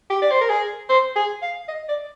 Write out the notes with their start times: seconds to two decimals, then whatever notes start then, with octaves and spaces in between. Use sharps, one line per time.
0.10 G4
0.22 D5
0.31 C5
0.41 A#4
0.49 G#4
0.89 C5
1.16 G#4
1.42 F5
1.68 D#5
1.89 D5